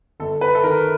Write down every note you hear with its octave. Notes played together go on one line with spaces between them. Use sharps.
G1 A4
B4
A4
D#3 A#4